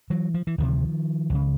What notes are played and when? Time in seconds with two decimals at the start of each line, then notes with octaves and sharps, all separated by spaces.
0.10 E3 F#3
0.34 F3
0.47 E3
0.58 D2 C3 D#3 F3
1.30 C#2 C#3